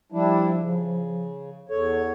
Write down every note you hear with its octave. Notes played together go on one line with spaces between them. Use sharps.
F3 G3 D4 E4
C#3
E2 A4 C#5